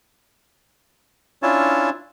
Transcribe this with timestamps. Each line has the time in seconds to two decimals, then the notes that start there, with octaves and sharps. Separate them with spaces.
1.43 C#4 D4 E4 F4 C#5 A5